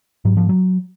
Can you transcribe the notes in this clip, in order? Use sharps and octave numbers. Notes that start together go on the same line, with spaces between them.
G#2 F#3
F3
F#3